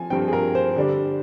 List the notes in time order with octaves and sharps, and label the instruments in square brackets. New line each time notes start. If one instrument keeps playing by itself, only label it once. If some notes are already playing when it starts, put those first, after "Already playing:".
Already playing: [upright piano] F3 C4 G#5
G2 F3 C4 G5
G#4
A#4
C5
D3 G3 D4